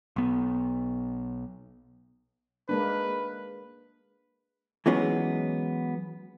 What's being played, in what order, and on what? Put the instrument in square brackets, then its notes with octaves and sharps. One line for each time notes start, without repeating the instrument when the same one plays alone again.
[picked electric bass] B1 B3
[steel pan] G#3 A#3 D4 [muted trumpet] B4
[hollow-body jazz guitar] E3 F#3 G#3 B3 C#4